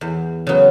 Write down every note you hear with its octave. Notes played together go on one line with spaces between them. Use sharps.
E2
C#3 F#3 B3